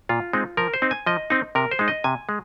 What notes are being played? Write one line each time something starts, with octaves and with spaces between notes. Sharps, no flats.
A#2 F4
G#3 C4 D#4
F3 A#4
C5
C4 D#4
G#5
F3 D#5
C4 D#4
C3 A#4
C5
G#3 D#4
D#5
C3 G#5
G#3